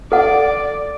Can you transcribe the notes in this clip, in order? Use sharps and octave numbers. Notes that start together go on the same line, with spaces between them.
A4 D5 F#5